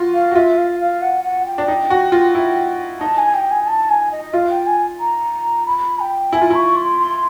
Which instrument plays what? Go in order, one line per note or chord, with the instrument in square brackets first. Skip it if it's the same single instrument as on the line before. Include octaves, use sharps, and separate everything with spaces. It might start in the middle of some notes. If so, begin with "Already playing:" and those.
Already playing: [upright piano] F4 F#4
[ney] F5
[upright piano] F#4
[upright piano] F4 [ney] E5
[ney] F5
F5
F#5
F#5
G5
[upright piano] D4
D#4
F#4
F4
E4
[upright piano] D#4 [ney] A5
[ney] G#5
G5
G#5
A5
G#5
D#5
[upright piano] F4 [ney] F5
[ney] G5
G#5
A#5
B5
G5
[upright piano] E4 [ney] G#5
[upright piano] F4
[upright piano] E4 [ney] C#6
[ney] C6
C6